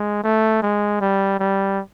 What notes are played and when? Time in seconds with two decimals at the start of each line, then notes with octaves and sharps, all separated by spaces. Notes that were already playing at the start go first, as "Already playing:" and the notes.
Already playing: G#3
0.23 A3
0.62 G#3
1.01 G3
1.40 G3